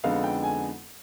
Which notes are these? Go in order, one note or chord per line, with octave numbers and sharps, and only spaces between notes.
F2 D3 G#3 B3 D#4 F5
G5
G#5